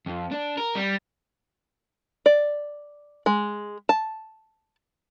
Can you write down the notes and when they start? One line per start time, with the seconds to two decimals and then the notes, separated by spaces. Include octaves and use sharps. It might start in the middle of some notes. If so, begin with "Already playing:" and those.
0.06 F2
0.31 D4
0.57 A#4
0.75 G3
2.26 D5
3.26 G#3
3.89 A5